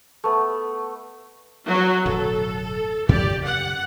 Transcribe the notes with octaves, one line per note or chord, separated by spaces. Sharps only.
A3 B3
F#3 F#4
D1 F#2 B2 A4
F#2 C#3 C#4 G4 D5
F#5